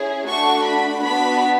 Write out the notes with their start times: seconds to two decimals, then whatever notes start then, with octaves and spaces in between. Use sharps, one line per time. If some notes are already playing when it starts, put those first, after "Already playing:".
Already playing: C#4 E4 G#4
0.28 A3 D4 F#4 C#6
0.65 B5
1.03 B3 D4 F#4 B5